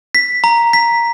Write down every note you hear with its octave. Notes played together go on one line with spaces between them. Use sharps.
B6
A#5
B6